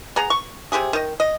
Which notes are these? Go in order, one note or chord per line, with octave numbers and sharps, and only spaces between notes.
B3 G#4 A#5
C#6
C3 F#3 G4 G#4
D#3 D#5
D#5